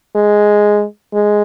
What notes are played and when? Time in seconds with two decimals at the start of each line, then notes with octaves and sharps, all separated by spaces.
0.15 G#3
1.14 G#3